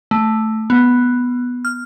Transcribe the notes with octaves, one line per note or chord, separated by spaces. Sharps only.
A3
B3
F6